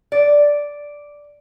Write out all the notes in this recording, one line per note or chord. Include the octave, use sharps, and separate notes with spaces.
D5